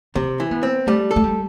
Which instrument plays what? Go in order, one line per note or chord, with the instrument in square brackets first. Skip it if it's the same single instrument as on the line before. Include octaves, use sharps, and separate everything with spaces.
[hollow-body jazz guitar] C3 [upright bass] C4
[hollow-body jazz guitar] E3
[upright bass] B3
[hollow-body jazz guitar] C4
[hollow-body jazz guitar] G3 [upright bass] A3
[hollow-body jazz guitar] A4
[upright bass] A3
G3